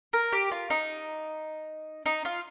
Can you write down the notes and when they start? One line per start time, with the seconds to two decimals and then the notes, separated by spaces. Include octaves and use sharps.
0.13 A#4
0.33 G4
0.52 F4
0.70 D#4
2.06 D#4
2.25 F4